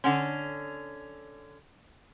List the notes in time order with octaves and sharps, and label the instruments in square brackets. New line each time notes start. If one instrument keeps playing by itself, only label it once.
[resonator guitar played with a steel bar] D3 C#4 [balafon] F#5 C6